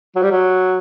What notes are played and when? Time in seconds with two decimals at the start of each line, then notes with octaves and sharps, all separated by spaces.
0.16 F#3
0.23 G3
0.31 F#3